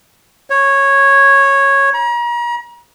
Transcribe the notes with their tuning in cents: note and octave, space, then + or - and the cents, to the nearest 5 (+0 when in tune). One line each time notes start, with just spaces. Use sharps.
C#5 -10
A#5 +40